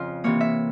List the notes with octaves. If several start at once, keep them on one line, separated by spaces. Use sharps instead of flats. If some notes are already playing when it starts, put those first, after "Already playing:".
Already playing: F2 C#3 F4
C3 E3 A#3 C#5
E5